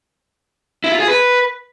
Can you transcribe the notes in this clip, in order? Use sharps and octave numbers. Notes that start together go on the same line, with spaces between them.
E4
F4
G#4
B4